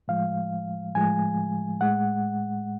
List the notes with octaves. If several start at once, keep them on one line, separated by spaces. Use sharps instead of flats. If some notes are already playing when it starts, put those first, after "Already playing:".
A2 F3 G#3 F5
A2 F3 G#3 G#5
A2 G#3 F#5